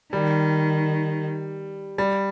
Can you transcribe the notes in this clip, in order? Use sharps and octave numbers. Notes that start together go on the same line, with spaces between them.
D#3 G3
G3